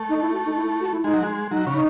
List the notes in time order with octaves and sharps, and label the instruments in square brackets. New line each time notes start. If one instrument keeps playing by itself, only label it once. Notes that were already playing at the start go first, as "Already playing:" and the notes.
Already playing: [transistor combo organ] A3
[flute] D#4
E4
F#4
D#4
E4
E4
F#4
E4
[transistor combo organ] G#3 [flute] D#4
[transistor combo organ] F#3
G#3
[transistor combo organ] F#3 [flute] D#4
[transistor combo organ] C#3
[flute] D#4